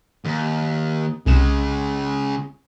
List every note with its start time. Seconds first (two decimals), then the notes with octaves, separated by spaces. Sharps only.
0.25 D#2
1.26 C2 C#3 G#3 E7